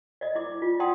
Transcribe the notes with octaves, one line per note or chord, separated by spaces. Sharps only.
D5 D#5
E4 D6
F4
D5 F#5 G5 A5 C6 D#6